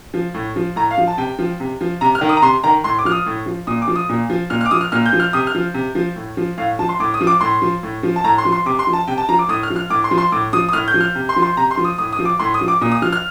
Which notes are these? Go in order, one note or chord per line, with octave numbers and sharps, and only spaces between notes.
F3
A2
F3
A2 A#5
F5
F3
A5
C3 G5
F3
C3
F3
C3 A#5
F6
D#3
D#6
A#5
C3 C6
D#3 A#5
A2 C6
D6
F3 F6
D#6
A2
F3
A#2 D#6
D6
F3
D#6
A#2
F3
A#2 F6
F6
D6
F3 D#6
F6
A#2 F6
G6
F3
F6
C3 D#6
F6
F3
C3
F3
A2
F3
A2 F5
F3 A5
C6
A2 D6
D#6
F3
D6
A2 C6
F3
A2
F3
A5
A2 A#5
C6
F3
C6
C3 D6
C6
F3
A5
C3 G5
A5
F3 A#5
D6
A2 D#6
F6
F3
F6
A2 D6
C6
F3
C6
A2 D6
F3 D#6
D#6
A2 F6
G6
F3
F6
C3
C6
F3
C6
C3 A#5
C6
F3
D#6
A2 D#6
D#6
F3
D6
A2 C6
D#6
F3
D6
A#2 D#6
D#6
F3 F6
F6